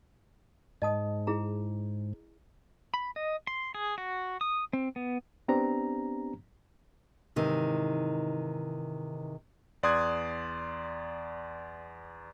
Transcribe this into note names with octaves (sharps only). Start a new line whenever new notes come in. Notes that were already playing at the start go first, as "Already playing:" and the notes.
G#2 D#5 A5 D#6
E4 G#4 A#5
B5
D#5
C6
G#4
F#4
D#6
C4
B3
B3 C4 D4 G4 A#5
G#2 C3 D#3 E3
E2 D5 C6 D#6 F#6 G#6